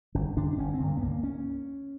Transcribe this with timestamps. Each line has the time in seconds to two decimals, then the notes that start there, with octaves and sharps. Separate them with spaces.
0.15 G1 C#4
0.37 G2 D3 D4
0.53 D4
0.58 G1 C#4
0.74 C4
0.80 G2 D3
0.88 A#3
0.97 B3
1.02 C#2 A#3
1.23 C#4